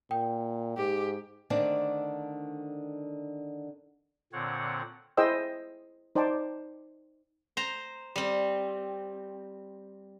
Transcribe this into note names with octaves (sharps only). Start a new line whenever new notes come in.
A#2 G5
G#2 G4
D3 D#3 A3 C4 D4
A#2 D3 C4 C#5 F#5
E4 G#4 C5 D#5 G5 E6
D#4 C5 D5 G5 A5 D6
C5 A#5
G3 C4